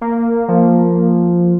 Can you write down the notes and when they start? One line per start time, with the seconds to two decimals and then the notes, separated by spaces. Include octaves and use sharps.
0.01 A#3
0.48 F3